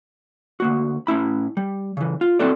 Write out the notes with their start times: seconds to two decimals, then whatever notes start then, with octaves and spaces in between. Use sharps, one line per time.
0.60 D2 A#3 F#4
1.07 A2 C#4 E4 B5
1.57 G3
1.97 C#3 E3
2.21 F4
2.39 C4 E4 F#4 A4 D5